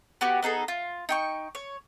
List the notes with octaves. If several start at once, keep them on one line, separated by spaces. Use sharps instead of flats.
B3 F#4 G4
B3 D#4 G#4 A4
F4
D#4 G5 C#6
C#5